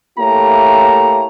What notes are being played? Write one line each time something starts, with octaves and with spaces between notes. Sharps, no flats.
A3 A#3 E4 G4 C#5 A#5